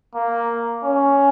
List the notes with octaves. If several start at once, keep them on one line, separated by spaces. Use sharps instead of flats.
A#3
C#4